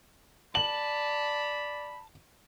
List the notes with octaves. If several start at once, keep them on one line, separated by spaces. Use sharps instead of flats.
D5 A5 B5 F#7